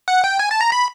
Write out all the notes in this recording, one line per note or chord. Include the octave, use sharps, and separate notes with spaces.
F#5
G5
G#5
A5
A#5
B5